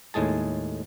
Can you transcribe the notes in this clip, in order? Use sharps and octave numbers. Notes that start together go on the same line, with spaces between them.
D#2 A2 G#3 G#4 A5